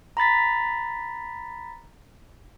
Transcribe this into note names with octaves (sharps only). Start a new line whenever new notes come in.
A#5 B5 A6 B6